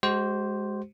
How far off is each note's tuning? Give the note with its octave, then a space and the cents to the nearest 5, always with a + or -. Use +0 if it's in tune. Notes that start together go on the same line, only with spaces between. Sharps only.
G#3 +0 F#4 +40 C5 +0